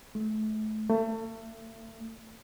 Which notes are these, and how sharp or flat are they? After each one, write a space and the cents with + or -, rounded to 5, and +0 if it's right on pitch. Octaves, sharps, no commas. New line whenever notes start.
A3 -30
A3 +30